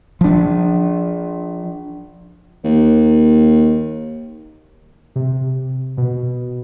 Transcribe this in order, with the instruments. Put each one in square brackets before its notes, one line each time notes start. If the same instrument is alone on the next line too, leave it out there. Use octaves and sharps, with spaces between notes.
[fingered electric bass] F3 D4
[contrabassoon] D#2
[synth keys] C3
B2